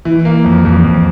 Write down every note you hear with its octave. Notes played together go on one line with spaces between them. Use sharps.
E3
A#3
F2
F2
F2